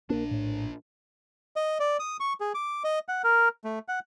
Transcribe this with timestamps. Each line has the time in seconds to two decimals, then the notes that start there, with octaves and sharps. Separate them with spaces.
0.10 A#1 A#3 D4
0.31 A2
1.56 D#5
1.80 D5
2.00 D#6
2.20 C#6
2.40 G#4
2.54 D6
2.84 D#5
3.09 F#5
3.24 A#4
3.64 A3
3.88 F#5